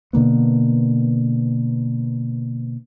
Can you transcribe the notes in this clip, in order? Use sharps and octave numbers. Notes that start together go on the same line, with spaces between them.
B2 D3 A#3 B3